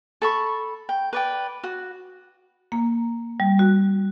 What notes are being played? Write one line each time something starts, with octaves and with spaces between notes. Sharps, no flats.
A4 B5 C#6
G5
B4 D5 G5
F#4
A#3
G3
F#4